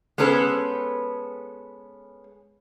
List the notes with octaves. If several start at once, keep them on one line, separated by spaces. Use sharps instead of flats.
G#3 B3 C#4 A4 B4 C5